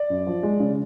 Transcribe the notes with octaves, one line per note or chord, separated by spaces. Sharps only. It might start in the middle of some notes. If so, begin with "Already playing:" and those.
Already playing: D5
F#2
F3
G#3
C#3